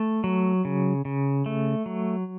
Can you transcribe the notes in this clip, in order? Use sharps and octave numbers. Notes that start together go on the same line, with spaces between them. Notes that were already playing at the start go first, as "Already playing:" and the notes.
Already playing: A3
F#3
C#3
C#3
A3
F#3